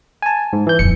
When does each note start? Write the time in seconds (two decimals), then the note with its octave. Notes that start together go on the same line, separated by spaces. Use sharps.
0.22 G#5 A5
0.53 G#2
0.67 E3 G6
0.79 D#1 F2 C#7